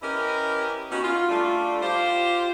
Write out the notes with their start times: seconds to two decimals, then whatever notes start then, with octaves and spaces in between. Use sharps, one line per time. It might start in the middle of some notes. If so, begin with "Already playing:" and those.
0.01 C#4 E4 G4 A#4 B4 D#5
0.91 B3 C#4 D#4 F#4
1.04 F4
1.29 G3 A3 D4 F4
1.82 F4 G4 C5